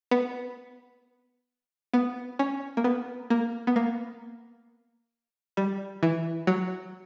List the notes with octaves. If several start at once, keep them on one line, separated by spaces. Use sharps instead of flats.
B3
B3
C#4
A#3
B3
A#3
B3
A#3
G3
E3
F#3